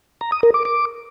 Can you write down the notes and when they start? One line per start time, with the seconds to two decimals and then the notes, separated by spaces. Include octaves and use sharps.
0.21 A#5
0.32 D#6
0.43 A#4
0.54 D6
0.65 D6